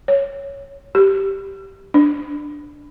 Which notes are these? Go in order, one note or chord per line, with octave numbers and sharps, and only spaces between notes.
C#5
G4
D4